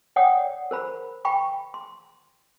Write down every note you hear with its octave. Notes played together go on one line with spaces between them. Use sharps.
C#5 D5 F#5 G5 D#6
A#4 C5 B5
G5 B5 C#6
C6